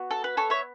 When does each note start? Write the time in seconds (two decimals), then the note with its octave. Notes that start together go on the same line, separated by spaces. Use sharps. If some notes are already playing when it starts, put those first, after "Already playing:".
Already playing: B3 F#4
0.11 A4
0.24 B4
0.37 A4 C#5
0.50 C#5 E5